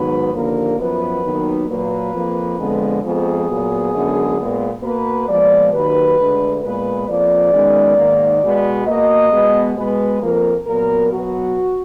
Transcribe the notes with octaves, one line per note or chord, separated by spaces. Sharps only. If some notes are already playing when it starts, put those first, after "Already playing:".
Already playing: G#2 D#3 F#3 B3 B4
D#2 D3 F3 A#3 A#4
F#2 F3 B3 B4
D#2 D#3 F#3 B3
A#2 F#3 A#3 B4
F2 F3 A#3
F2 D3 G#3 B3
F2 F3 G#3 B3 G#4
A#2 F#3 B3
F#2 D3 G#3 B3
A#2 G#3 B3
B2 A#3 B4
A#2 F3 G#3 B3 D5
D#2 D#3 F#3 B4
D2 D3 G#3
A#2 G#3 B3 B4
F2 F3 A#3 D5
F#2 D#3 G#3 B3
G#2 D#3 A#3
B2 G#3 B3
B2 A#3 D#5
B2 G#3 B3
B2 G#3 B3 B4
F2 F3 A#3 A#4
A#2 F#3 B3 A#4
B2 F#3 B3 F#4